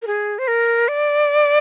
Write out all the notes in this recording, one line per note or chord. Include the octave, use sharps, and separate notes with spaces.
A#4
G#4
C5
A#4
D5